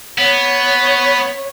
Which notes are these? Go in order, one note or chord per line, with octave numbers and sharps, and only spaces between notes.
B3 C#5